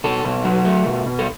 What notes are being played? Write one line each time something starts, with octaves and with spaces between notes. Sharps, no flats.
B2 A4
B2
F#3
A3
B2
B2
A4